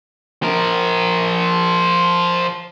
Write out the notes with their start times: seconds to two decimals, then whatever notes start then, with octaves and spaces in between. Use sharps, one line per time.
0.43 F3 A#4